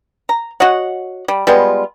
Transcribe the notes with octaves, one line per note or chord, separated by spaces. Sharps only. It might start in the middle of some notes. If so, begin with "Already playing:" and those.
A#5
F#4 C#5 D#5 F#5
G3
G3 G#3 B3 F4